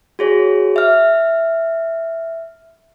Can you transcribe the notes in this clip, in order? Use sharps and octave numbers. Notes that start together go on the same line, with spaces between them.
F#4 G#4 C#5
E5 F6